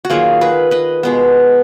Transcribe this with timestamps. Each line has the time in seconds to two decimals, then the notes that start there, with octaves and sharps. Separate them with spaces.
0.05 F#4
0.10 D#3 F#3 A#3 F4 G#4
0.41 G#4 B4
0.71 B4 D#5
1.03 B2 G#3 B3